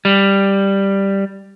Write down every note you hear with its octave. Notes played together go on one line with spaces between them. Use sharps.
G3